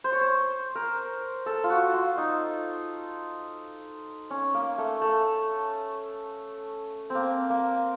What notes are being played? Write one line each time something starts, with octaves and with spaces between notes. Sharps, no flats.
C5
C#5
C5
A#4
A4
F4
F#4
F4
D#4
C#4
A#3
A3
A3
C4
A#3
A#3